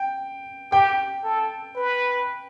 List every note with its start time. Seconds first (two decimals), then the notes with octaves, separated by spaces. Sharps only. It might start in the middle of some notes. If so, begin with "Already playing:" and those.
Already playing: G5
0.72 G4 G5
1.24 A4
1.76 B4